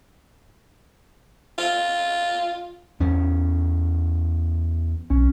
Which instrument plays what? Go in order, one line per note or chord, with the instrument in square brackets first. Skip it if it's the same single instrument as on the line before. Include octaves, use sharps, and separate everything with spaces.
[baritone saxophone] F4
[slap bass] E2 C#4
[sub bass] B1 [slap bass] C#4